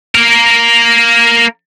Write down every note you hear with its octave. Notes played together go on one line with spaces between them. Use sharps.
A#3 A#4